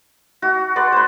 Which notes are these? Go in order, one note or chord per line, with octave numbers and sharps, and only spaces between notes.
F#4
B4 D5 C6
B4 C5